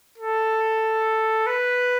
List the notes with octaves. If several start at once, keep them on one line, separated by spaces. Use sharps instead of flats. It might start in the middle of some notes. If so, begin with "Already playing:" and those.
A4
B4